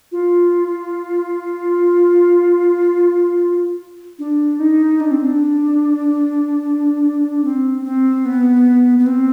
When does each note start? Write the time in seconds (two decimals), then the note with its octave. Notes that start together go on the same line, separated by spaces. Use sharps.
0.12 F4
4.19 D4
4.59 D#4
5.00 D4
5.11 C4
5.24 D4
7.44 C4
7.84 C4
8.25 B3
8.99 B3
9.06 C4